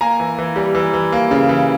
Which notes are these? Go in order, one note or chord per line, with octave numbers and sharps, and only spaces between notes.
A#3 G#5 A#5
E3
E3
G3
E3
E3
A#3
C#3
E3